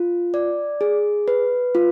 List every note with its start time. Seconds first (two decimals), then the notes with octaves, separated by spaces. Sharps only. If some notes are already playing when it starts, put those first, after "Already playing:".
Already playing: F4
0.34 D5
0.81 G#4
1.28 B4
1.75 F4